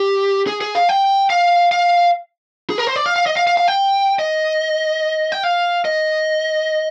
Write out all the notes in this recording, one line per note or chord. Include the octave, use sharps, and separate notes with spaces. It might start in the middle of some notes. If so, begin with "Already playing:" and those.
Already playing: G4
G#4
G#4
F5
G5
F5
F5
G#4
A#4
C5
D5
F5
F5
D#5
F5
F5
F5
G5
D#5
G5
F5
D#5